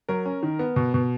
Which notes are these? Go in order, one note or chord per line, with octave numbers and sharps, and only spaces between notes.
F#3 A#4
C#4
D#3
B3
B2
B2